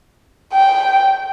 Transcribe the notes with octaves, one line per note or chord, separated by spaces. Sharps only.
G5